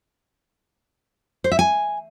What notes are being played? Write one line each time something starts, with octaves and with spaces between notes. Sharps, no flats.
C5
E5
G#5